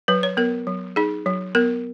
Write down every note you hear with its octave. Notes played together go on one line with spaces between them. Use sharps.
F#3 B4
C#5
B3 A#4
F#3
D#4 G#4
F#3
B3 A#4